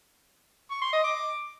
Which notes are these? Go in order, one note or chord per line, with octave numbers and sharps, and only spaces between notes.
C#6
C6
D#5
D6